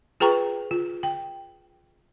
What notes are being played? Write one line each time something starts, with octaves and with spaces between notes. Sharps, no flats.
F4 G#4 B4 G5 A#5 C#6
F4
G5